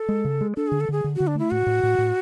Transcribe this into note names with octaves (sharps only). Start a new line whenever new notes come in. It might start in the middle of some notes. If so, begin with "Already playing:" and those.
Already playing: A4
G#3
C#3
G#3
D4 A4
D3 G#4
A4
D3 G#4
D3
D3 F#4
D4
A3 E4
A2 F#4
A2
A2
A2